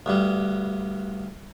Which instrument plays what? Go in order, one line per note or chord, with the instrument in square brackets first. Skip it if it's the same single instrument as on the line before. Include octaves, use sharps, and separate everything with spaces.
[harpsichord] D2 G2 G3